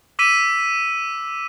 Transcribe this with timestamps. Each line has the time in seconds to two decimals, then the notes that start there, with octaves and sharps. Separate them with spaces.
0.19 D6 E6 B6 D#7